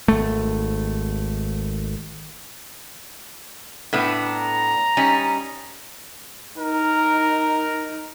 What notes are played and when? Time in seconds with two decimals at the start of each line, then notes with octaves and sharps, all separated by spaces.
0.08 G#1 A3
3.93 A2 B3 D4
4.26 A#5
4.97 G3 C#4 D#4
6.58 D#4 A#4